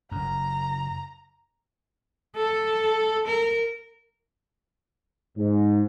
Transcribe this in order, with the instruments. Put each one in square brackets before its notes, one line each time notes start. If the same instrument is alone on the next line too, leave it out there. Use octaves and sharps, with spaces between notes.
[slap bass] F#1 F#2 [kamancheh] A#5
[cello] A4
A#4
[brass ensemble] G#2